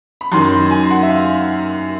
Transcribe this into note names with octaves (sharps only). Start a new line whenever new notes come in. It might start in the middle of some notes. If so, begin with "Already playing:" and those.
B5
F#2 D#3 F#3 C6
C6
G#5
F#5
E5
F5